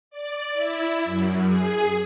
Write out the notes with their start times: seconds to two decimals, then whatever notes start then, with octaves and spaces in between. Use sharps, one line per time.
0.11 D5
0.53 E4
1.04 F#2
1.47 G#4